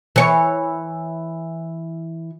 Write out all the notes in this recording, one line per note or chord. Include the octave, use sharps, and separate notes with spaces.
E3 C#5